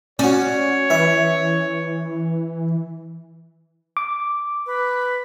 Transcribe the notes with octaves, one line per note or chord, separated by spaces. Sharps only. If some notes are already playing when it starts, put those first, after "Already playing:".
C#4 F#4 C#5 D5
E3 E5
D6
B4